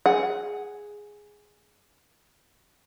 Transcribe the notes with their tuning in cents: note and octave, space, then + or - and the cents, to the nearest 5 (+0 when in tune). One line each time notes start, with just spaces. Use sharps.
G#4 +0 F#5 +10